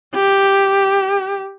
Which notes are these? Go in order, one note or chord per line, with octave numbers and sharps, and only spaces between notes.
G4